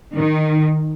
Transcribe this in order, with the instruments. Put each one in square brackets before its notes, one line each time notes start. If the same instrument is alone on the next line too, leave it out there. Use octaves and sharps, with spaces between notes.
[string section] D#3